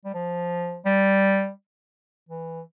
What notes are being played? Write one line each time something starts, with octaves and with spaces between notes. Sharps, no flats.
G3
F3
G3
E3